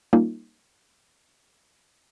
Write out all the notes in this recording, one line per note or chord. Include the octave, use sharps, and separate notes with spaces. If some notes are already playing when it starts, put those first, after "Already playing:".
G3 A#3 C#4 D#4 F4